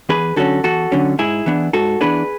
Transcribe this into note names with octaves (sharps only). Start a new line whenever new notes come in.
E2 G#4 B4
D3 F#3 C#4 F#4 A4
E2 F#4 A4
D3 F#3 C#4
G#2 E4 G#4
E3 B3 D4
G#2 F#4 A4
E3 B3 D4 G#4 B4